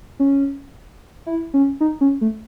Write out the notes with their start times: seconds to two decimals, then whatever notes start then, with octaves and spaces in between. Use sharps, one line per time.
0.20 C#4
1.26 E4
1.54 C#4
1.81 D#4
2.01 C#4
2.21 A3